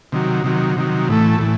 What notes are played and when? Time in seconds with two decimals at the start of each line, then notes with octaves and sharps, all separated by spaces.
0.12 C3 D#3 F#3
0.44 C3 D#3 F#3
0.77 C3 D#3 F#3
1.09 A2 E3 A3
1.40 A2 E3